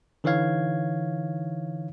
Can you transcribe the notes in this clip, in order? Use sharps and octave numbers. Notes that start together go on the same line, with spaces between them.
D3 E3 D#4 C#5 F5 G#6